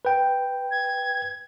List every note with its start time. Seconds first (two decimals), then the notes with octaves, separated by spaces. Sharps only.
0.05 B4 G5
0.71 G#6